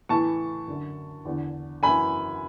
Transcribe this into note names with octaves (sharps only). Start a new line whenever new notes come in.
A2 E3 A5 C#6
F#2 D3
E2 D3
F#2 E3 G#5 B5